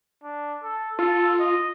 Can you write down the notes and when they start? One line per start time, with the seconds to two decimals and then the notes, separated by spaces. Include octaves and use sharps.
0.24 D4
0.64 A4
0.99 F4 A4
1.40 D#5